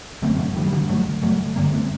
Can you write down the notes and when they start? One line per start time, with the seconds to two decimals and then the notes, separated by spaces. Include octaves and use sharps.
0.22 F#1 F#2 D3 A3 C4
0.39 F#3 A3
0.56 D#3 G3
0.67 G3
0.73 D3 F#3
0.89 G1 G2 D3 F#3 A3
1.23 F#3 A3
1.56 G1 G2 D3 G3 A#3
1.73 A3 C4